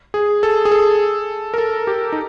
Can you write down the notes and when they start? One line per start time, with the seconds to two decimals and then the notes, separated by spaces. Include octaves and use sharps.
0.14 G#4
0.43 A4
0.65 G#4
0.72 A4
1.54 A#4
1.58 A4
1.87 G4
2.12 D#4